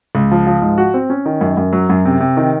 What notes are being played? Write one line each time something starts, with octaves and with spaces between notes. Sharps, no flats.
C#2
F3
F3
G#2
F#4
C4
C#4
D#3
F#2
F#2
F#3
F#2
C3
C3
D#3